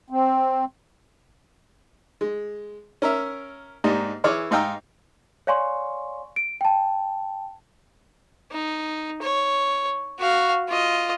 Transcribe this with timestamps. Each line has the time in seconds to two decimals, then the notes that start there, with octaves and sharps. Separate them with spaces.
0.10 C4
2.21 G#3
3.02 C#4 A#4 E5
3.84 G#2 A#3 D4 D#4 G4
4.24 E3 G#4 C#5 D6 F6
4.51 G#2 D#4 F5 G5 A#5 E6
5.47 C#5 D5 F5 G#5 C6 C#6
6.36 D7
6.61 G5 A5
8.52 D#4
9.22 C#5
10.19 F#4 F5
10.68 F4 D#5